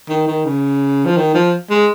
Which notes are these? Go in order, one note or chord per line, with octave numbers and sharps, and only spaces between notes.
D#3
D#3
C#3
F3
D#3
F3
G#3